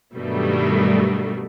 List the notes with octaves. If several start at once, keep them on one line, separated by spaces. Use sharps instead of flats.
G2 B2 D#3 F#3 G3 A3